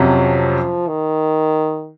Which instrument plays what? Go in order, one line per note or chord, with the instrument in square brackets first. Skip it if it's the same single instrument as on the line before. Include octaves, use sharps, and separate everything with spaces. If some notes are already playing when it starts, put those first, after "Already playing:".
Already playing: [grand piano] F2 C3 F#3 C#4 [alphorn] F3
[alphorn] D#3